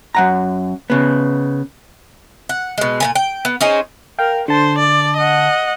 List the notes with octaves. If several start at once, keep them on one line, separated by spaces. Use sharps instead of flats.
F#2 F#5 A#5
C#3 B3
F#5
B2 G#3
A#2 B3 G#5
G5
B3
C#4 D#4 G#4 C5
A#4 F5 G5
D3 C5 A5
D5
D#5 F#5